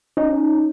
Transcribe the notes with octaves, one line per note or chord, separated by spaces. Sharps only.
C#4 D#4